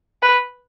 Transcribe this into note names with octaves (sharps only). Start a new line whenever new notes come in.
B4